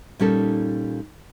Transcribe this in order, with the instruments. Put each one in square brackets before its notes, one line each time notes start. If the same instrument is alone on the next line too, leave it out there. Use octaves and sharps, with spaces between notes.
[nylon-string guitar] A#2 G3 C#4 D#4 A4